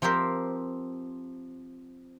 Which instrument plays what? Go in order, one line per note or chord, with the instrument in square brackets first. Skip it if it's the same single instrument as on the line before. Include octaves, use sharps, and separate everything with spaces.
[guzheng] F3 C4 G4 A#4 C5